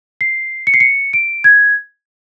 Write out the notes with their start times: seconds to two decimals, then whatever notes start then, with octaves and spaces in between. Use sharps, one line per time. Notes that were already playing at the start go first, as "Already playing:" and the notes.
0.21 C7
0.67 C#7
0.74 C7
0.80 C#7
1.13 D7
1.44 G#6